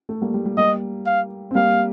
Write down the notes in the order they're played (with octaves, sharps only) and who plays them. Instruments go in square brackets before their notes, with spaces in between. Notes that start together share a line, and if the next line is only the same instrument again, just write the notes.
[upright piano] A3
G3 A#3
G3
G3
[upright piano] G3 A#3 [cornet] D#5
[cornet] F5
[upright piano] C4
[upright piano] G3 A#3 [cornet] F5